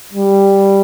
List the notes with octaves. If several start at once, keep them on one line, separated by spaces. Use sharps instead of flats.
G3